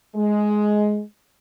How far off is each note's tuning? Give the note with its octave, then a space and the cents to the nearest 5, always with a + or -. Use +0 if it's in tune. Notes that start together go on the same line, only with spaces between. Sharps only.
G#3 +10